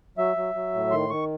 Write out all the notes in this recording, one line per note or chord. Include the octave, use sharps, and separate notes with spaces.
F#3 E5
F#3
F#3
A2
D#3 C6
D#3 C#6